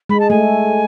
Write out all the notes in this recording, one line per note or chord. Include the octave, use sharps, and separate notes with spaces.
G#3 B5
A5
A3 G#5